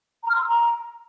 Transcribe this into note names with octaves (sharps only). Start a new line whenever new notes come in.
A#5
F6
C6
E6
A#5